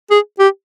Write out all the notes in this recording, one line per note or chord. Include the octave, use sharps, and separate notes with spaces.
G#4
G4